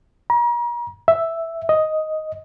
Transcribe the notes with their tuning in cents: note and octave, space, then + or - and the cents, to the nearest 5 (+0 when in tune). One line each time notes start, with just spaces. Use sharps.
A#5 +40
E5 +0
D#5 +5